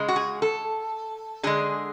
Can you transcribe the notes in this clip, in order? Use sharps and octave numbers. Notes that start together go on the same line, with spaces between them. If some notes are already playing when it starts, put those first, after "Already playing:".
Already playing: C#3 G#3
F#4
G#4
A4
D3 G#3 G#4